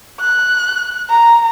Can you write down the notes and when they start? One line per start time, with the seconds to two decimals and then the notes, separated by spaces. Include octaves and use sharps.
0.20 F#6
1.10 A#5